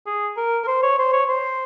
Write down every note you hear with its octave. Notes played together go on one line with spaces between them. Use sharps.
G#4
A#4
A#4
C5
C#5
C5
C#5
C5